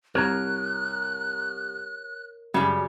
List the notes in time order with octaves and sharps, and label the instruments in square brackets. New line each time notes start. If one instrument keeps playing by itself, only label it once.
[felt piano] C2 [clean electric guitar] A#4 C#5 A#5 [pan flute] F#6
[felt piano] F#2 [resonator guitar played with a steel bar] C#3 G3